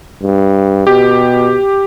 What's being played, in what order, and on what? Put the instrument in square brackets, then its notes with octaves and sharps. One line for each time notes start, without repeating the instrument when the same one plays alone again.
[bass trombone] G2
[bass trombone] B2 [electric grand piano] G4